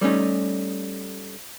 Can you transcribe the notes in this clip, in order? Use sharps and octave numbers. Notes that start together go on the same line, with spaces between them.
G3 A3 C#4 D#4